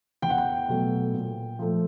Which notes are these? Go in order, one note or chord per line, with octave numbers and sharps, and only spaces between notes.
E2 G5
F#5
G5
B2 F#3 A3
A#2
F3 A3